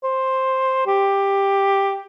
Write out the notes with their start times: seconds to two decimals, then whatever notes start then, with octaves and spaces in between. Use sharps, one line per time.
0.04 C5
0.87 G4